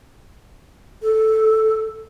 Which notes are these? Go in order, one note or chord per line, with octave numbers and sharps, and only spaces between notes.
A4